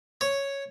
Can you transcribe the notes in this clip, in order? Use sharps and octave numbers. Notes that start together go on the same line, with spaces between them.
C#5